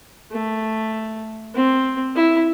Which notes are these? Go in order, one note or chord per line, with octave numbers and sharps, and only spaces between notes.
A3
C4
E4